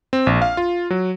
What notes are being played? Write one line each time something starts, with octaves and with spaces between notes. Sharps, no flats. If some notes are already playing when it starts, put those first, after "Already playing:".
C4
A#1
F5
F4
F#3